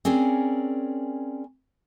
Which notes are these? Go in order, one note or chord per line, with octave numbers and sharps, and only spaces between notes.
C4 C#4 G#4 A#4 D5